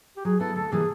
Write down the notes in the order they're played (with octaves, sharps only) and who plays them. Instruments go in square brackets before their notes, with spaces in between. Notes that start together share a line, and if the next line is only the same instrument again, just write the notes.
[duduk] G4
[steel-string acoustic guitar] F#3 [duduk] G#4
[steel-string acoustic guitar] B3 E4 [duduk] A4
[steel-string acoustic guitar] D2 [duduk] A4
[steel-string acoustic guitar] C3 E3 G3 A#3 [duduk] G#4